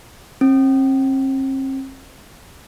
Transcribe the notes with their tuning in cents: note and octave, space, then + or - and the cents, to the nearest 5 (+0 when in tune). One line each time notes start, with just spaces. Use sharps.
C4 +40